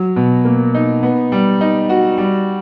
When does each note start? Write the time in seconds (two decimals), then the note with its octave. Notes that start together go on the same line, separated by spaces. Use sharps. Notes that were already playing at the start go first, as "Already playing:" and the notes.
Already playing: F#3
0.16 B2
0.45 A#3
0.74 D#4
1.03 B3
1.32 G3
1.61 D#4
1.89 F#4
2.18 G3